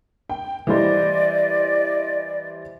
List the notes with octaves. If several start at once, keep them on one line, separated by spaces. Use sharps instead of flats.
G5
E3 G3 C5 D5 D#5